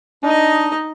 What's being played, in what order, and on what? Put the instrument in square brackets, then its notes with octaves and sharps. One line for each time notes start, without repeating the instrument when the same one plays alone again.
[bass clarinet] D4 [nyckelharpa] D#4 D#5